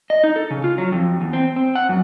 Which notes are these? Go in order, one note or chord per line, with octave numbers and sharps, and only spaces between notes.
D#5
D#4
A4
C#3
F4
F#3
F2
E2
C4
C4
F#5
F#2